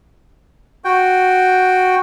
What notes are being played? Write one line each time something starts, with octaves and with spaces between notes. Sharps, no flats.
F#4 G5